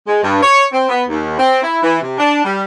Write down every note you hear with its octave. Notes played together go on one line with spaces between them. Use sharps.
G#3
G2
C#5
C4
B3
D#2
C4
E4
E3
C3
D4
G3